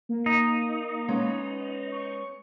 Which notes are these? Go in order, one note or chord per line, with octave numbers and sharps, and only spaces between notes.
A#3
D#4
G#3 B3 C#4
C#6